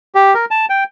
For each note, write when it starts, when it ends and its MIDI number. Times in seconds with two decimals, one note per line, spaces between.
0.15 0.34 67
0.34 0.45 70
0.51 0.66 81
0.69 0.84 79